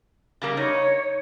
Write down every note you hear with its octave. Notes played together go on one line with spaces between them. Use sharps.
C#3 G3 A#3
D#4 C#5